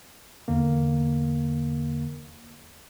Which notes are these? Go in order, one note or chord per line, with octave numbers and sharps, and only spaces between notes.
E2 D3 A#3